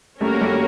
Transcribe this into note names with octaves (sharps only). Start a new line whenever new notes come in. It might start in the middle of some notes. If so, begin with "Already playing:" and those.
G3 A3 A#3 C#4 F#4 A#4 C#5
G3 A3